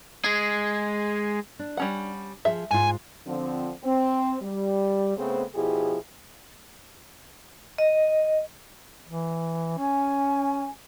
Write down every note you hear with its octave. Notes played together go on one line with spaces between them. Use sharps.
G#3 G#4
D4
G3 C#4 F#5
F3 G#4 E5
G#2 F4 G#5
D3 F3 C4
C4
G3
C#3 A3 B3 C4 G#4 C5
B2 F3 E4 G4 G#4
D#5
E3
C#4 G#5